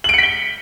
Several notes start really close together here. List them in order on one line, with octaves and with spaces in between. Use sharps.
F#7 D7 C#7 B6 G7